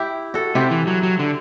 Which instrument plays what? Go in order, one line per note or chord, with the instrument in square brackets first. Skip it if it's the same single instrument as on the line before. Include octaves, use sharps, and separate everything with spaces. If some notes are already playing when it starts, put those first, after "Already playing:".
Already playing: [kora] E4 G4
F#4 A4
[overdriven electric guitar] C3 [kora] E4 G4
[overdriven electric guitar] E3
F#3
F#3
D3